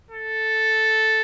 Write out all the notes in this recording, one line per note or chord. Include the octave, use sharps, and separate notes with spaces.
A4